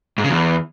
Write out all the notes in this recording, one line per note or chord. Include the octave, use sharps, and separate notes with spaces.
G#2
C#3
E2